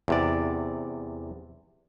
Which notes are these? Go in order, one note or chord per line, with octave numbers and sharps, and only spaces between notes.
E2 C3 D5